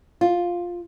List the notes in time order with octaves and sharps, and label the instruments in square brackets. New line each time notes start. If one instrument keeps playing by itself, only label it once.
[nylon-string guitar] F4